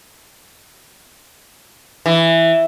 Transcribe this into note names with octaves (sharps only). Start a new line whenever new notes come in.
E3